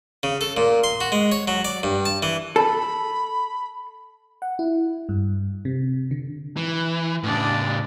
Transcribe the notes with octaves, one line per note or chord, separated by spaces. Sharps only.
C#3
A4
A#2
C6
F#4
G#3
C#5
F#3
D5
G2
A5
E3
A4 B5
F#5
E4
G2
C3
D3
E3
A2 C#3 D4 D5